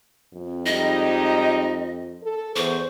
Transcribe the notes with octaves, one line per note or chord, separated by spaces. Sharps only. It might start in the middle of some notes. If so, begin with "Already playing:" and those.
F2
G3 G#3 D#4 D#5
A4
E2 C5 C#6